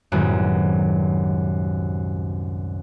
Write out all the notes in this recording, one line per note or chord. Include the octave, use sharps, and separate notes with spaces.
C2 F#2 A2 D#3 G#3 B3